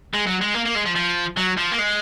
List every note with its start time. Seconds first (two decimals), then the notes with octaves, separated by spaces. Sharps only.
0.14 G#3
0.27 F#3
0.41 G#3
0.54 A#3
0.65 A#3
0.75 G#3
0.86 F3
0.96 F3
1.37 F#3
1.57 F3
1.72 A#3
1.79 G#3